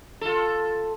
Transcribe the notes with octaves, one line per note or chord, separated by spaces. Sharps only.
F4 A4